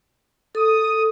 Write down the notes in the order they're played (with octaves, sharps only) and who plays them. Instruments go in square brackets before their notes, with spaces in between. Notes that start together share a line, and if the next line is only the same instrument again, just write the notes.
[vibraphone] A4 [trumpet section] D#6